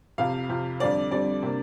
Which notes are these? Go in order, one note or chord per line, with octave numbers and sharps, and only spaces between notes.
F2 C3 F3 F5
F2 C3 F3
F2 D3 G3 C4 D5
F2 D3 G3 C4 D5
C3 A#3 D4